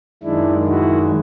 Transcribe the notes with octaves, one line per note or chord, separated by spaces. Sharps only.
F#2 D#3 G#3 D4 E4
E4 F#4